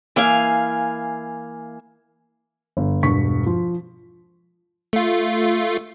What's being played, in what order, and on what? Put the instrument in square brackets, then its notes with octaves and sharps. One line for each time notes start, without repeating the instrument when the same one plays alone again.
[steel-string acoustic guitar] E3 A#3 F5 G#5
[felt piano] G1
E1 G2 C#6 B6
F3
[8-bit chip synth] A3 F4